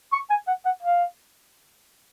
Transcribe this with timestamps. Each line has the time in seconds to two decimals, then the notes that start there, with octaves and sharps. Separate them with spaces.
0.13 C#6
0.30 G#5
0.47 F#5
0.65 F#5
0.83 F5